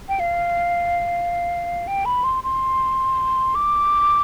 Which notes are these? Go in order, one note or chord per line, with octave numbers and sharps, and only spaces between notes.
G5
F5
G5
B5
C6
C6
D6